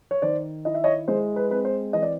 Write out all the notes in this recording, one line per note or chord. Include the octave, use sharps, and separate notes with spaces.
C#5
D#3 C5 D5
E4 D#5
E5
C#5 D#5
G#3 C5
B4
C4 B4
C5
E3 D#5
D5